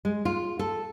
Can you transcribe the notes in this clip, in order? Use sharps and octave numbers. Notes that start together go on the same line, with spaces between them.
G#3
F4
A4